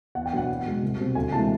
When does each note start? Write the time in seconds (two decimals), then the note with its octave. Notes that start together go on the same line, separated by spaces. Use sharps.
0.15 E2 F#5
0.26 G5
0.32 B2 F#3 B3 D4 F#5
0.49 E2
0.66 B2 G#3
0.83 C2
0.99 B2 G3 C4
1.15 D2 G#5
1.32 C3 E3 G#3 A5